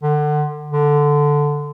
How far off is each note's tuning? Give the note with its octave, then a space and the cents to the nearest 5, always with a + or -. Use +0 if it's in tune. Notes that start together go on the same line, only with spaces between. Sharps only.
D3 +30
D3 +0